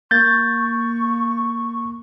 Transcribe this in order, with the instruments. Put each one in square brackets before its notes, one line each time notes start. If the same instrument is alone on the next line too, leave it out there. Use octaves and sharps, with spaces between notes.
[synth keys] A#3 [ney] C#6 [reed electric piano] G6 A6